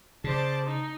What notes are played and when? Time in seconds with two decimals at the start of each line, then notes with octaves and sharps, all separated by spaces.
0.24 C#3 C5 D5 A5
0.66 D#4